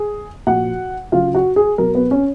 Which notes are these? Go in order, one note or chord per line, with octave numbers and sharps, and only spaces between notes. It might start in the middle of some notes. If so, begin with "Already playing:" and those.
Already playing: G#4
A#2 F3 F#4 F#5
C#3 F#3 F4 F5
F#4 F#5
G#4
B2 F#3 A#4
B3 B4
C#4 C#5